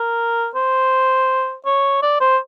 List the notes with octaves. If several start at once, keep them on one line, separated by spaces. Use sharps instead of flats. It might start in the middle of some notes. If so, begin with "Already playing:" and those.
Already playing: A#4
C5
C#5
D5
C5